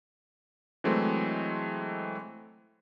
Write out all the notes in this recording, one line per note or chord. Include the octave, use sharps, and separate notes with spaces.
E3 F#3 G#3 A3 C4